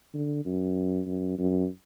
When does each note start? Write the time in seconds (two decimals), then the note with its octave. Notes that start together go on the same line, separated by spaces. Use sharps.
0.14 D3
0.46 F#2
1.07 F#2
1.38 F#2